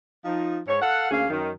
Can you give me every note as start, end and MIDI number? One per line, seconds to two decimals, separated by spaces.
0.25 0.59 53
0.25 0.59 63
0.67 0.77 44
0.67 0.77 73
0.81 1.09 69
0.81 1.09 77
0.81 1.09 78
1.10 1.29 38
1.10 1.29 58
1.10 1.29 61
1.10 1.29 68
1.10 1.29 77
1.30 1.51 42
1.30 1.51 51